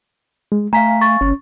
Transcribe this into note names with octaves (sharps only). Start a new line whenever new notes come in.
G#3
A3 F5 G#5 A#5 B6
C#6 A6
G1 C#4